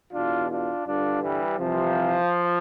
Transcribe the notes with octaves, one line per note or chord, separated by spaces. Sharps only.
E2 B2 D4 F4
D4 F4
G2 D3 D4 F4
E3 G3
C2 C3 E3 F3